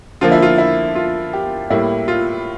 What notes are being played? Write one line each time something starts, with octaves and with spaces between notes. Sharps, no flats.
D3 F3 A#3 F4
E4
F4
E4
F4
G4
A2 G3 A#3 E4
F4